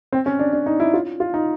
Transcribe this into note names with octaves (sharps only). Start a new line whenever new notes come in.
C4
C#4
D4
D4
D#4
E4
F4
F4
D#4